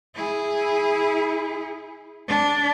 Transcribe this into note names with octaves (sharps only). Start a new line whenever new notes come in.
E4 G#4
D4